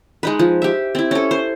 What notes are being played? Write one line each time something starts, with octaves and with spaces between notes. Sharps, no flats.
G#3 D#4 B4
F3
G4 E5
C4 E4
C#4 A4
C5